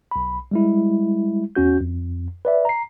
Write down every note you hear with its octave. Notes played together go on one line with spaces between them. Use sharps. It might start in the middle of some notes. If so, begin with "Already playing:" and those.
B1 B5
G3 G#3 E4
E2 C#4 F#4 G6
F2
B4 D5 E5
A#5 C7